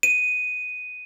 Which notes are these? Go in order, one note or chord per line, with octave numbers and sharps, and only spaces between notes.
D#7